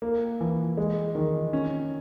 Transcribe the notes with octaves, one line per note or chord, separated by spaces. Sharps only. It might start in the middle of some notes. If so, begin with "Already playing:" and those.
A#3
E3
G#3
D#3
C#4